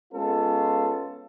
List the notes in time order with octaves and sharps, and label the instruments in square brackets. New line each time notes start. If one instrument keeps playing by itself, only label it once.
[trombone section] G#3 B3 C#4 F4 A4